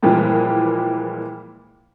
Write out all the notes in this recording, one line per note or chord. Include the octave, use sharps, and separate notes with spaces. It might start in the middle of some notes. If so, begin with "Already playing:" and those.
A#2 E3 F3 G3 G#3 A#3